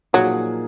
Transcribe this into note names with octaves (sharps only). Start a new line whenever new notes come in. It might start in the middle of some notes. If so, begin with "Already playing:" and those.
A#2 F3 F#3 A#3 D#4 G#4